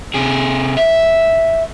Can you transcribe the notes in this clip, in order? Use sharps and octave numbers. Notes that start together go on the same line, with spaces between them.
C3 G#4
E5